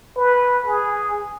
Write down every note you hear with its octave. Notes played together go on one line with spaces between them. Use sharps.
B4
G#4